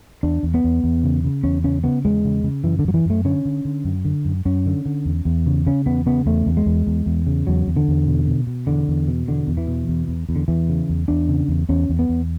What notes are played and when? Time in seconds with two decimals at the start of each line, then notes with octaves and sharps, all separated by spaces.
0.23 E2 D4
0.43 E2
0.54 B3
0.64 E2
0.84 E2
1.04 C#3
1.24 C#3
1.44 E2 C#4
1.64 C#3 C#4
1.83 C#3 B3
2.04 E2 G#3
2.25 C#3
2.44 C#3
2.64 F#2 E3
2.79 D3
2.84 F#2 F#3
2.94 E3
3.05 F#2 A3
3.25 D3 C#4
3.45 D3
3.65 D3
3.84 F#2
4.05 D3
4.25 F#2
4.45 F#2 C#4
4.66 D3
4.86 D3
5.05 E2
5.25 E2
5.46 C#3
5.66 C#3 C#4
5.86 E2 B3
6.06 C#3 B3
6.26 E2 A3
6.46 E2
6.57 G#3
6.66 E2
6.87 E2
7.06 E2
7.27 C#3
7.47 E2 F#3
7.67 E2
7.76 D3
7.88 E2
8.07 B2
8.27 B2
8.47 B2
8.67 E2 D3
8.88 E2
9.08 B2
9.28 E2 D3
9.47 E2
9.57 E3
9.67 B2
9.88 E2
10.08 E2
10.29 E2
10.36 D3
10.48 E2 E3
10.69 C#3
10.89 E2
11.08 E2 D4
11.29 C#3
11.48 E2
11.69 E2 C#4
11.89 E2
11.99 B3
12.09 E2